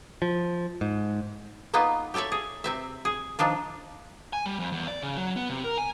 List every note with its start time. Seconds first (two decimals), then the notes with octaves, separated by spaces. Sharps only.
0.22 F3
0.81 G#2
1.74 A#3 B3 D#4 F4 B4
2.14 G4 A4 C#5 D5 E5
2.32 G#4
2.64 C3 C4 E5
3.05 G#4
3.39 D#3 F3 D4 F4
4.33 G#5
4.46 G3
4.60 F2
4.72 E2
4.88 D5
5.03 C#3
5.17 F#3
5.36 B3
5.50 C3
5.64 A#4
5.78 G#5